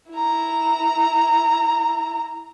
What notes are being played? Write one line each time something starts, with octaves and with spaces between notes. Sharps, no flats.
E4 A#5